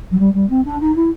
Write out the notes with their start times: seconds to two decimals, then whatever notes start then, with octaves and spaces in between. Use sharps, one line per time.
0.11 F#3
0.19 G3
0.34 G3
0.49 C4
0.65 D4
0.80 D#4
0.95 E4